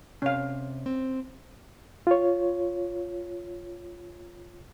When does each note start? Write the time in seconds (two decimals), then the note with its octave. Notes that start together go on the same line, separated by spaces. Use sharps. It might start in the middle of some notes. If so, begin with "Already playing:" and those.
0.22 C3 C#4 F5
0.86 C4
2.07 F4 C#5